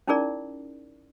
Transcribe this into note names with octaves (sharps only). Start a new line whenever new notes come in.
C#4 D#4 E4 G#4 A#4 D5